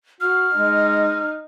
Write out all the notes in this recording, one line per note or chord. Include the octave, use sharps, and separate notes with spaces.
F#4 F6
G#3 D#4